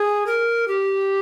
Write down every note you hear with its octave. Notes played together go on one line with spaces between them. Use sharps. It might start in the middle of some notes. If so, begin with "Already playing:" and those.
Already playing: G#4
A#4
G4